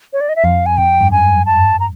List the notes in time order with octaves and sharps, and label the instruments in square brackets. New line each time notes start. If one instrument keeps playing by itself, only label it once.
[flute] C#5
D5
D#5
E5
[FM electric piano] F2 [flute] F5
[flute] G#5
[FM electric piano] F2 [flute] G5
[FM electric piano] G2
[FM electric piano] F#2 [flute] G#5
[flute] A5
A#5